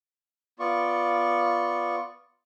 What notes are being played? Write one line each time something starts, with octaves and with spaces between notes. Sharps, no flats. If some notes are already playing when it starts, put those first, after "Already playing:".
B3 F4 D5 C#6